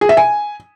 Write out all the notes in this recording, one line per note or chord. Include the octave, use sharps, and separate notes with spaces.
G#4
E5
G#5